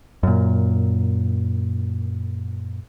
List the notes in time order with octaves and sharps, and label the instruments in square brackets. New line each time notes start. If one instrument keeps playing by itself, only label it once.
[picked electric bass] F#2 A#2